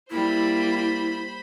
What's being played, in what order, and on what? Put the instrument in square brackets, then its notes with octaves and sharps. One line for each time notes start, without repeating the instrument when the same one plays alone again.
[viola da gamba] G3 A#3 [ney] E4 [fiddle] C5 B5